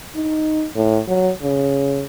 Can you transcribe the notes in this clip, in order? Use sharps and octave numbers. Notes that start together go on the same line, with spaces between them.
D#4
A2
F#3
C#3